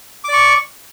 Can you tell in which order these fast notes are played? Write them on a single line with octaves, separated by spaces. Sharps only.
D6 D5 C#6